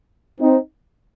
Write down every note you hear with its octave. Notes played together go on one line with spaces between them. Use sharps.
C4 D#4